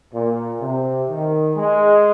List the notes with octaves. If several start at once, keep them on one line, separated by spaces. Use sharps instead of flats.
A#2
C3
D#3
G#3